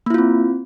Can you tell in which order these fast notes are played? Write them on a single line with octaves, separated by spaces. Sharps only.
A#3 E4 F4 C4